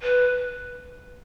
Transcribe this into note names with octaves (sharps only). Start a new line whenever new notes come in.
B4